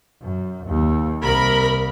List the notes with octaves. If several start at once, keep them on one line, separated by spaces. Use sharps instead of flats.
F#2
D#2
C2 A#4 B5